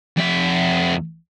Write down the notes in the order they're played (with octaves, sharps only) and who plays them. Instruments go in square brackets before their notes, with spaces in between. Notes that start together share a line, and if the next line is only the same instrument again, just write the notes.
[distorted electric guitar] F2 E5